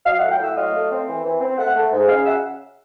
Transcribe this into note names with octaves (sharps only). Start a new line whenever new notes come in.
F#3 D#5 F5
E5 F#5
A2
F5 G5
A2 E5 F#5
F#3 D#5 F5
A3
C4
E3
E3
C4
A3 E5 F#5
A3
G#2
C#3 D#5 F5
E5 F#5